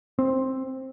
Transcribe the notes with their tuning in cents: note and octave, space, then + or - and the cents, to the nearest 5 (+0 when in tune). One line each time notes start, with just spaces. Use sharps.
C4 +10